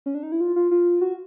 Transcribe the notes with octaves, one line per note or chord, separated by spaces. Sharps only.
C#4
D4
D#4
E4
F4
F4
F4
F#4